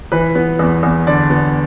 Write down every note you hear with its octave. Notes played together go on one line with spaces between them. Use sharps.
E3 B4
B3
E2
E2
D3 D5
B3